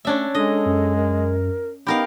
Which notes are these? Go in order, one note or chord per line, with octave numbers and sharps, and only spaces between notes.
A3 C#4 D4 E5
G#3 D4 A4 D#5
F#2
A#4
B3 D#4 G4 A#4 F5 B5